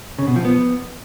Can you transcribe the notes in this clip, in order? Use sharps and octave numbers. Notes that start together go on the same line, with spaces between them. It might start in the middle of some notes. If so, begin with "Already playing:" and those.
C#3
B2
F3
B3